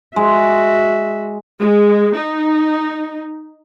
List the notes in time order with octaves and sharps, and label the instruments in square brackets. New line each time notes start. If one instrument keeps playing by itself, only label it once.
[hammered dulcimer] G#3 [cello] F#4 E5
[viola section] G#3
D#4